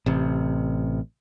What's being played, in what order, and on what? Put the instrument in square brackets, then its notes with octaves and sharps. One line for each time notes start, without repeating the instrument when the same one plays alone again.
[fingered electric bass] A1 C3